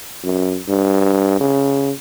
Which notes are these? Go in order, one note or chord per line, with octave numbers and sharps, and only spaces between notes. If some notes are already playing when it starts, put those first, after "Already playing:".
F#2
G2
C#3